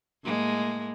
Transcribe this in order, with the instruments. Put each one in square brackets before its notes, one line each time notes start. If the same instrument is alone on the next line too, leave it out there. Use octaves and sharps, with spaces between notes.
[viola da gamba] A2 G#3 A#3